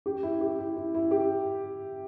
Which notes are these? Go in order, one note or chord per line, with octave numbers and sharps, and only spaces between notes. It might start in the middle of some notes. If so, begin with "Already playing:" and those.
G4
E4
G4
E4
E4
E4
G4